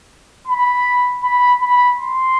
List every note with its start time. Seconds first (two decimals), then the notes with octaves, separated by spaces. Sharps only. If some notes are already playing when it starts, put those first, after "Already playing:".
0.47 B5
1.23 B5
1.60 B5
1.98 C6